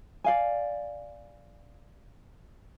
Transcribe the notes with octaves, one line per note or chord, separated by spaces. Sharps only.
D5 F5 G#5